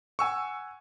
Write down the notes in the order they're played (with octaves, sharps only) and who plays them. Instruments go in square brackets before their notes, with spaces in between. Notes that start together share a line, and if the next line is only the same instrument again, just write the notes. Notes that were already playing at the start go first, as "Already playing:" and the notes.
[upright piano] F#5 G#5 [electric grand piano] C#6 E6